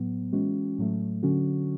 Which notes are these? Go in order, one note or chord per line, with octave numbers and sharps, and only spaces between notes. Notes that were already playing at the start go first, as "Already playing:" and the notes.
Already playing: A2 F#3 B3
E3 G#3 C#4 F#4
A2 F#3 A3
D3 F#3 C#4 F#4